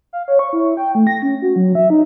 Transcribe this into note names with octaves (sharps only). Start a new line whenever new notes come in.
F5
C#5
C#6
E4
G5
A3
A#6
C#4
F#4
F#3
E5
D#4